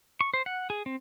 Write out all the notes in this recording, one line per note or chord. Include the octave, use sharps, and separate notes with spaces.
C#6
C5
F#5
G#4
C4